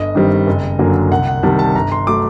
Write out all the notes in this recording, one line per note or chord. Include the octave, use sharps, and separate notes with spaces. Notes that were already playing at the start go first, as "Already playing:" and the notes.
Already playing: G1 D#5
G2 D#3 G3 C4
F#1
F#2 D3 F#3 A#3
C2 F#5
F#5
C3 D#3 G3 A5
A5
G1 A#5
C6
F#3 A3 D6